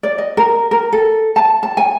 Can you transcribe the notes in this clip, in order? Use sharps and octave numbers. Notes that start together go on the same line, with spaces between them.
D5
D#5
A#4
A#4
A4
A5
A5
G#5